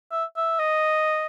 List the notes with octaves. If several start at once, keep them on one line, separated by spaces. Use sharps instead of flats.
E5
E5
D#5